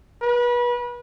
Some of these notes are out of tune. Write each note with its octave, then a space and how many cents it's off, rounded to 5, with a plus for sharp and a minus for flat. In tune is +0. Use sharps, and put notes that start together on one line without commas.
B4 -30